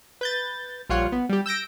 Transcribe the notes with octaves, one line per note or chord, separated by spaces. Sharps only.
B4 G6 A6
A#1 G3 F4 C#5 F#5
B3
G3 G4
E6 G6 A#6 D7